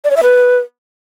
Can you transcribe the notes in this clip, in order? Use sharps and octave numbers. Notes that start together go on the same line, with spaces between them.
D5
C#5
E5
B4